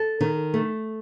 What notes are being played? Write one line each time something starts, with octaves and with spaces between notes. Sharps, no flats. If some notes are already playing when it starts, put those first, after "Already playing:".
Already playing: A4
D#3
A3